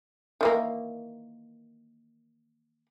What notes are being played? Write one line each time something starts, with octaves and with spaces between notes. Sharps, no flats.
D#3 E3 A#3